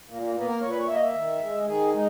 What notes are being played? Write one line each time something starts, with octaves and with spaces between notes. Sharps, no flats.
A#2 A#3
A#3
A#3 B3
A#4
A#2 C#5
B4
C#5
A#3 E5
D#5
E5
D#3
G#3
D#3 G#4
G#3 D#4